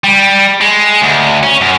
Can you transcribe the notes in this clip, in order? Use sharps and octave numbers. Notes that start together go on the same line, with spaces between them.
G3
G#3
D2
C#4
F#2